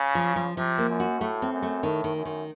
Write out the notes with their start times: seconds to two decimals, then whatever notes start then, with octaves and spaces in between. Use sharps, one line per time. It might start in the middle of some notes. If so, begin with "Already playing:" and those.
Already playing: C#3
0.15 F3
0.36 F3
0.57 C3 F3
0.78 A#3
0.89 F#2
1.00 F#4
1.20 A2 A3
1.42 C4
1.53 F#2
1.63 A3
1.83 A2 D#3
2.04 D#3
2.16 F#2
2.25 D#3